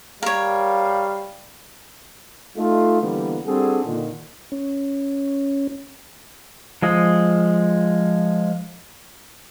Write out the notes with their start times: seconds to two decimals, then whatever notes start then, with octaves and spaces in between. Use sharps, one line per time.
0.23 G3 A#4 C#5 F5
2.57 A3 D#4 F4
3.01 D3 E3 G3 A#3 B3
3.45 G3 C4 D4 F#4 G#4 A4
3.86 A#2 D3 D#3
4.52 C#4
6.82 F3 G#3 D#6